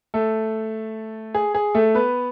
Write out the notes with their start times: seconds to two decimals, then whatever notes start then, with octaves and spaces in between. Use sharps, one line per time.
0.14 A3 A4
1.34 G#4
1.55 G#4
1.75 A3 A4
1.95 B3 B4